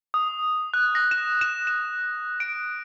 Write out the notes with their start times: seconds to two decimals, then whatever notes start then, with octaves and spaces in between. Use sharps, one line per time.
0.14 D#6
0.74 F#6
0.95 A#6
1.11 E7
1.41 E7
1.67 E7
2.40 D7